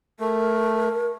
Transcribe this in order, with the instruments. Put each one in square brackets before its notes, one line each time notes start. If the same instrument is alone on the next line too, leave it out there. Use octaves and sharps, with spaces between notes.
[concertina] A3 [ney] A#4